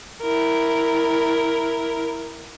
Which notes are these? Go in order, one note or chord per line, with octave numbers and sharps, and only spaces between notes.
E4 A#4